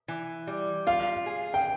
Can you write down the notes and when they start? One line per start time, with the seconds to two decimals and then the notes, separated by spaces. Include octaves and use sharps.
0.08 E3
0.47 G3
0.87 F4 F5
1.26 G#4
1.54 G5